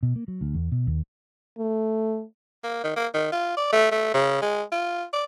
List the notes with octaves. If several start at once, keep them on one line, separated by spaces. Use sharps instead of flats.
B2
A#3
F#3
D2
E2
B2
D#2
A3
A#3
D#3
A#3
D#3
F4
D5
A3
A3
C#3
G#3
F4
D5